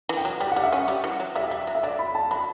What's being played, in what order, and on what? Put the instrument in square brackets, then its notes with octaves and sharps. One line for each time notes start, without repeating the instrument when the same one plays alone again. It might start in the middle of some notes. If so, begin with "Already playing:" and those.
[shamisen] E3
[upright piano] G5
[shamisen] F#3
[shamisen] G3 [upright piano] G5
[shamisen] G3 [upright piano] F#5
[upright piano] E5
[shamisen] C#4 [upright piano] F#5
[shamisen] G3
E3
F#3
[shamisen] G3 [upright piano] E5
[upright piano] E5
[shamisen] G3
F#3
[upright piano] E5
[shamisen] F#3 [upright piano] D5
[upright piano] B5
A5
[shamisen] F#3 [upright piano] B5